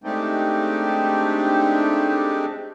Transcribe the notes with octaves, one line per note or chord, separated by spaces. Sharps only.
G#3 A3 C4 D4 D#4 G4